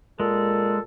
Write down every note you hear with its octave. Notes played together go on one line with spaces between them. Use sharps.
A#2 G#3 A4